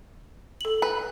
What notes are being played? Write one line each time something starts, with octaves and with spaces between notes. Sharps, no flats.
A4 F#7
B4